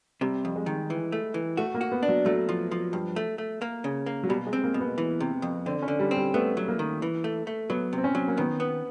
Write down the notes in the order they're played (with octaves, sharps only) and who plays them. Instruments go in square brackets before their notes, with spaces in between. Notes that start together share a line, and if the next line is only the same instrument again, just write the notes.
[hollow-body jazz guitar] C3 [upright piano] G3
[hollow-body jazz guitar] F2
[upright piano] G#3
[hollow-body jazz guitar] D#3
E3
A3
E3
[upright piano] A3 [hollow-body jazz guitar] F#4
[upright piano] A#3
[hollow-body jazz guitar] F#4
[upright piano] B3
[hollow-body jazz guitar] D4
[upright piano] F#3
[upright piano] F#3 [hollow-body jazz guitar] A3
[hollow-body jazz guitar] F3
F3
G2
A3
A3
A#3
C#3
A#3
[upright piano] F#3
[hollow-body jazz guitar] B2 [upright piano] G3
[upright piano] G#3
[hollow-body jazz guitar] C4
[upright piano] A#3
[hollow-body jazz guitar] B2
[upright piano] B3
[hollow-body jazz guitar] E3
C3
F2
[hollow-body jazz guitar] D3 [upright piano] C4
[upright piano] C#4
[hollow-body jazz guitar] D3
[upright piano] G3
[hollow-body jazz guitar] C4
[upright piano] G3
[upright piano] A3 [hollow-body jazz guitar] B3
[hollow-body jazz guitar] F#3
[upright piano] A#3
[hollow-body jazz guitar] D#3
E3
A3
A3
[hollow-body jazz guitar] F#3 [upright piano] B3
[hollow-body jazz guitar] C3
[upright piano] C4
C#4
[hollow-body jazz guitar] F#3
[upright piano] A#3
[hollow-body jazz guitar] D#3 [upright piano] B3
[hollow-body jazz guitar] B3